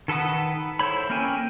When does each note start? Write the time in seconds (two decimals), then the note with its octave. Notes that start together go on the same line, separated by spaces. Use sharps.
0.08 D#3 A4 B4 F#5 D#6
0.79 E4 A4 C5 C#5 B5
1.10 A#3 C#4 A#4 G5 G#5